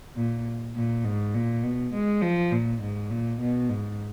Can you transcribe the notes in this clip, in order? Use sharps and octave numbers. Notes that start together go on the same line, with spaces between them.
A#2
A#2
G#2
A#2
B2
G#3
F3
A#2
G#2
A#2
B2
G#2